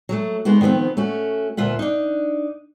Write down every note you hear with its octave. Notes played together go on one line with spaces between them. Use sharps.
F#3 G#3 A3
G#3 B3 D#4 F#4
D#3 F3 A3 B3 C4
A3 C#4 F#4
D2 A#2 F4 E5 F#5
D4 D#4